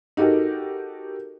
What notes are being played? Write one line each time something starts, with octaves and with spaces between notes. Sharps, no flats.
D#4 F#4 G4 A4 A#4